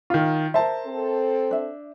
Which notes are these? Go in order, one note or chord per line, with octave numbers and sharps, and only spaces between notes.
D#3 F4
A#4 C5 E5 A5
C4 A4
D4 E5